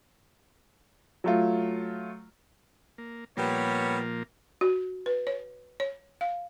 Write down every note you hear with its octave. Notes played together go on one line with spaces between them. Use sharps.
F#3 A3 F4
A#3
A#2 F3 G3 A#3 B3 C#5
F#4
B4
C#5
C#5
F5